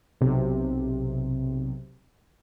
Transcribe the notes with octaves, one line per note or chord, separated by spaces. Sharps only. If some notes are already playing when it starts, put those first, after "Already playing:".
B1 C3